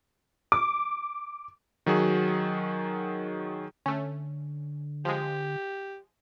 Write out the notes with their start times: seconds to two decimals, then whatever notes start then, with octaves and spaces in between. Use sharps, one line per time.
0.52 D6
1.86 D#3 F#3 F#4 G#4
3.86 D3 A3 C#4
5.05 F3 G#3 G4